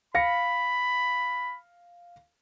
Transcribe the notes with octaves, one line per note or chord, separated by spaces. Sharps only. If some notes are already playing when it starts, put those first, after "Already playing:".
F5 B5 A#6 C#7